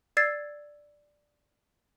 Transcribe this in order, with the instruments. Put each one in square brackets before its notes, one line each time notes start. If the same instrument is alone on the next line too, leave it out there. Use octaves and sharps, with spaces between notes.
[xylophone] D5 E6 G#6 A6 C7